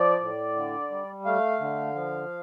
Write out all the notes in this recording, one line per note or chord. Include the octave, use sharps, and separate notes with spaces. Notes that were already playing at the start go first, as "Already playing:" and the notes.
Already playing: F3 D5
A2
D3
G3
A3 F5
D3
F3